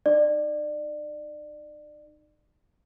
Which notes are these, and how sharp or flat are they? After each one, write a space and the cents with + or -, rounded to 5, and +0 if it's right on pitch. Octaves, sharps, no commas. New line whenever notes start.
D#4 -25 D5 +25